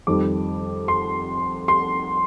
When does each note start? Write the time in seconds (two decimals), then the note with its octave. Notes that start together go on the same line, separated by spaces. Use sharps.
0.07 F2 D#3 G3 D6
0.88 C6
1.68 C6